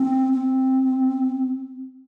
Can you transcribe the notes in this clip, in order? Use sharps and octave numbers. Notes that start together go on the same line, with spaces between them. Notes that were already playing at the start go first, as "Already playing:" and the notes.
Already playing: C4
C4